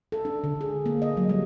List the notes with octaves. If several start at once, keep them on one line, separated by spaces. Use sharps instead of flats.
A4
D4
D3
G#4
A#3
D#5
F#3
G3